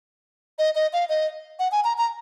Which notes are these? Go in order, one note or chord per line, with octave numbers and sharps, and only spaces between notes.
D#5
D#5
F5
D#5
F#5
G#5
A#5
A#5